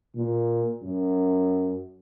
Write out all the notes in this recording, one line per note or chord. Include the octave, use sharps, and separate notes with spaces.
A#2
F#2